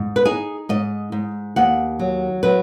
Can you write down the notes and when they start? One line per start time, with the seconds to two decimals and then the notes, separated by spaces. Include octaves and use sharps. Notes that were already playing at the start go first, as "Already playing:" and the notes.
Already playing: G#2
0.16 B4
0.25 D#4 G#4
0.69 G#2 D#5
1.12 G#2
1.56 D#2 F#5
1.99 F#3
2.43 F#3 B4